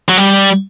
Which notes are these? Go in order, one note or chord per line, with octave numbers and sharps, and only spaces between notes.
F#3
G3